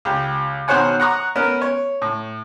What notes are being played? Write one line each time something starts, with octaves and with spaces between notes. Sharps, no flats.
C#2 G4
B2 D#3 C5 C#5 F#5 G#5
F#5 A#5 C#6 D#6
B3 C#4 A#4
C#5
A2